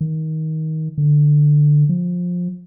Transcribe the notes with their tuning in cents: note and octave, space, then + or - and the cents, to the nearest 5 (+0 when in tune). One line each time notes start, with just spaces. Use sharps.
D#3 +20
D3 +10
F3 +20